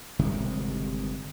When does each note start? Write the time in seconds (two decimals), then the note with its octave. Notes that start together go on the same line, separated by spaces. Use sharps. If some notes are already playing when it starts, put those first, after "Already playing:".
0.19 G1 C3 D#3 G#3